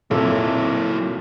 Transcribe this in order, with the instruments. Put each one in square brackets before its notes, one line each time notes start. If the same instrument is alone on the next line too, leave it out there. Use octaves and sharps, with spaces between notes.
[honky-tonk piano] B1 F2 A#2 [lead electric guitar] F#3 E4 [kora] A4